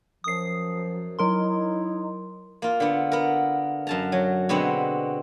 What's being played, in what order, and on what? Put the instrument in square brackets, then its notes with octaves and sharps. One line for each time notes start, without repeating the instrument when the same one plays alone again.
[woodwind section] F#2 F3 [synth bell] D#6 C7
[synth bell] F#3 A#4 C6 [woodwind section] D#4 E4
[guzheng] A#3 F4
D3 B3
B3 A#4
F#2 A5 A#5
F#3
B2 D3 G#3 B3 C4